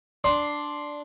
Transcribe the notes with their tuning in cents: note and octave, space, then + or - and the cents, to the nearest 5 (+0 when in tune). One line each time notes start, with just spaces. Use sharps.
D4 +0 C6 +0